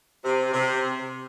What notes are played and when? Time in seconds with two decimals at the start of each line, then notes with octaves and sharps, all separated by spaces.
0.24 C3
0.53 C3